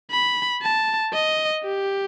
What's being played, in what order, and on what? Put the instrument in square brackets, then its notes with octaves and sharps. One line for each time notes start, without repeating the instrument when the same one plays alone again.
[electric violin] B5
A5
D#5
G4